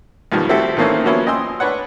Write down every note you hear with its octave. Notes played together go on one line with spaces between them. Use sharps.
B1 E2 D#3 F3 G3
A3 C4 E4 F#4 G4 A4
D#3 E3 A3 A#3 C4 C#4
F3 F#3 A#3 B3 C#4 E4
D#5 G5 G#5 C6 D#6 E6
D4 B4 C#5 F#5